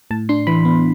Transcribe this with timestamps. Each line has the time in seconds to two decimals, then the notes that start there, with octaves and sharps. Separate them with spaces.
0.11 A2 A5
0.29 D4 C6
0.47 E3 B5
0.65 B3